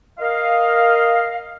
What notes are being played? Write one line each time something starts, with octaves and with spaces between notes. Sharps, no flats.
A#4 D#5 F5